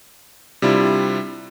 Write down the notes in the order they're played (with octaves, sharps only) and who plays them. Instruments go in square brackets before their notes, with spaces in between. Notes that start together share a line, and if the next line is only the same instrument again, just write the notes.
[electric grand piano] C3 G3 D4 E4 F4